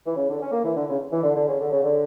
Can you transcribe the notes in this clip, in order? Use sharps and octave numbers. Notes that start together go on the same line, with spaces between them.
E3
C#3
D3
C#4
A#3
E3
D3
C#3
E3
D3
D3
C#3
D3
C#3
D3